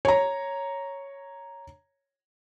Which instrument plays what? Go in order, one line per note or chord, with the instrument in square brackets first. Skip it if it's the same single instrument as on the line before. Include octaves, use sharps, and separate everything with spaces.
[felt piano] C#5 A#5